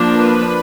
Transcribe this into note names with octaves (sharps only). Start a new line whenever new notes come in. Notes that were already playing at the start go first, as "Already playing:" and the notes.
Already playing: F3 A#3 D4
B4